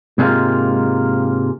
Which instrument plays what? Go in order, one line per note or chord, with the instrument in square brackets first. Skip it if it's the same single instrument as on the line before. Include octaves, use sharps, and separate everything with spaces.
[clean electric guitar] G#2 C3 G3 G#3 A#3 F4